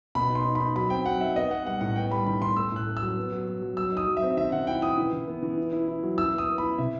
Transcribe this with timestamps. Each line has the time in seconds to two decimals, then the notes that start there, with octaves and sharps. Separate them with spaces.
0.15 B2 B5
0.30 D#4
0.35 C6
0.45 D#4
0.55 B5
0.61 D#4
0.76 F#3 B5
0.90 C4 G5
1.05 F#3 F#5
1.21 D#4 E5
1.36 B3 D#5
1.51 B3 F#5
1.66 G3 F#5
1.81 A2 F#5
1.96 B3 G5
2.11 G3 B5
2.26 D#3 B5
2.41 D#3 C6
2.56 A3 E6
2.72 A2 F#6
2.86 A3
2.97 E6
3.02 F#3
3.17 B3
3.32 F#3
3.47 F#3
3.62 F#3
3.77 F#3 E6
3.92 D#4 D#6
4.07 F#3
4.17 E5
4.22 C4
4.37 D#3 E5
4.52 D#3 F#5
4.67 E4 G5
4.82 E4 D#6
4.98 E3
5.13 E3
5.28 B3
5.43 E3
5.58 E4
5.72 E4
5.88 E4
6.03 F#3
6.18 E4 E6
6.33 B3
6.38 D#6
6.48 B3
6.58 E4 B5
6.78 C3 E5